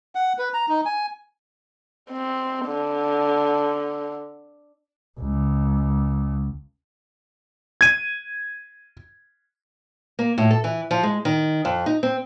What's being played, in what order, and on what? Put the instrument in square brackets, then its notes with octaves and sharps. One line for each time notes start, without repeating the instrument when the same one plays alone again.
[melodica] F#5
B4
A#5
D#4
G#5
[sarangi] C4
D3
[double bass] C#2
[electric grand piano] G#6 D#7
[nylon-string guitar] A#3
A2
A4
E3
F3
G#3
D#3
F2
D#4
C4